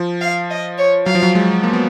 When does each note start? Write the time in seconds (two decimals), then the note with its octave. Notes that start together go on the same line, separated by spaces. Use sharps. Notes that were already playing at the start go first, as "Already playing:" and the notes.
Already playing: F3
0.21 F5
0.50 D#5
0.78 C#5
1.06 F#3 F5
1.15 F3
1.23 F#3
1.35 G#3
1.63 A#3
1.73 B3